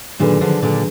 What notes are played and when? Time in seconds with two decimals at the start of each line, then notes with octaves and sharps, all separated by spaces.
0.20 A#2 D3 D#3 F#3 D4 G#4 B4
0.41 D3 F3
0.62 A#2 D3